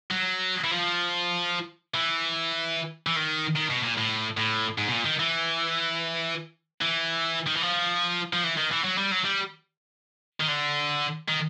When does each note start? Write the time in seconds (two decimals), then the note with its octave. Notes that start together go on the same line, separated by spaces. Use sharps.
0.11 F#3
0.64 E3
0.71 F3
1.94 E3
3.07 E3
3.16 D#3
3.56 D#3
3.70 B2
3.83 A#2
3.98 A2
4.37 A2
4.78 G#2
4.88 B2
4.92 A#2
5.05 D#3
5.20 E3
6.81 E3
7.47 D#3
7.55 E3
7.63 F3
8.33 F3
8.44 E3
8.57 D#3
8.71 E3
8.84 F#3
8.98 G3
9.12 F#3
9.25 G3
10.40 D#3
10.48 D3
11.28 D#3